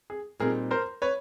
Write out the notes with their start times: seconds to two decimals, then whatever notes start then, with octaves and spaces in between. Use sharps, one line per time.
0.10 G#4
0.40 A#2 G3 C4 D#4 G#4 A#4
0.71 A#4 C5
1.02 B4 C#5